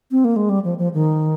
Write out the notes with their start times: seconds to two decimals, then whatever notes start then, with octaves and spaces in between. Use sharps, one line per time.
0.11 C4
0.25 A#3
0.36 G#3
0.49 G3
0.64 F3
0.78 F3
0.94 D#3